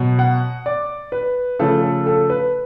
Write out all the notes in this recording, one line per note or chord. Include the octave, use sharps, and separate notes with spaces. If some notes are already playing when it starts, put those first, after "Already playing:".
Already playing: B2 F#3 B3
F#5
D5
B4
C#3 F3 A3 A4
A4
A4
B4